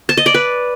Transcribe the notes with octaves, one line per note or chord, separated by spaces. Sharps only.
A5
D#5
D5
B4